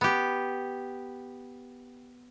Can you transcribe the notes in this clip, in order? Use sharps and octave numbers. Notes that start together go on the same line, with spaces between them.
B3 G4